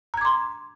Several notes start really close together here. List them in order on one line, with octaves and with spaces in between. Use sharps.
A#5 G#6 D6 C6